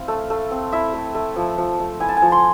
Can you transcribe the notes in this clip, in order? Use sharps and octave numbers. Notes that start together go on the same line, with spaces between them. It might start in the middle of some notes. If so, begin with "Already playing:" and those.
Already playing: C4 E4 F5
A3
A3
C4
E4 E5
A3
A3
F3
F3
A3
E4 G#5
A5
G#5
F3
C6